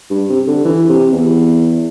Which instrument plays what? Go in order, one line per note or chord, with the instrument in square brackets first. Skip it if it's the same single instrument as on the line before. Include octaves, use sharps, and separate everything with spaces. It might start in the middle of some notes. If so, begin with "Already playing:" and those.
[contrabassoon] G2
C3
D3
E3
C3
E2